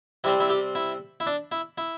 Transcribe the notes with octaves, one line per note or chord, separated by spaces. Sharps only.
C3 G3 C4 E4
E4
G4
E4
E4
D4
E4
E4